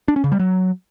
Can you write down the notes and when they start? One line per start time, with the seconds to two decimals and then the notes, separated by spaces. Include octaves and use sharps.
0.08 D4
0.16 C#4
0.24 C#3
0.32 G3
0.39 F#3